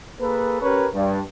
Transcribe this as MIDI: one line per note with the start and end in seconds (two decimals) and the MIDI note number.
0.20 0.59 58
0.20 0.59 68
0.20 0.59 69
0.20 0.59 71
0.62 0.86 61
0.62 0.86 67
0.62 0.86 70
0.62 0.86 71
0.62 0.86 73
0.94 1.20 43